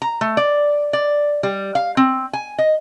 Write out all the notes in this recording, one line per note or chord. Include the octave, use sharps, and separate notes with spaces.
A#5
A3
D5
D5
G3
F5
C4
G#5
D#5